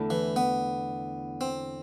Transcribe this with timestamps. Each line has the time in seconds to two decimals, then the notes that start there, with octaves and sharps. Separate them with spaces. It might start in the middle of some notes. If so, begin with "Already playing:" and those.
Already playing: E2 D3 A3 E4 A4
0.10 E3
0.36 B3
1.41 C4